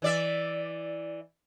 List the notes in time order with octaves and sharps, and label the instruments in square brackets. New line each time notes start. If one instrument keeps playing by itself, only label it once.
[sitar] E3 D5 E5